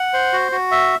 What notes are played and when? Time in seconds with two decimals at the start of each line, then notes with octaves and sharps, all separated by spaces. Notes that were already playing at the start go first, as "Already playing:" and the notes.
Already playing: F#5
0.13 C5
0.33 F#4
0.52 F#4
0.72 E5